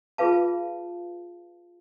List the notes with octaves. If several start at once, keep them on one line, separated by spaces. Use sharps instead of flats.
F4 G#4 B4 F5 A5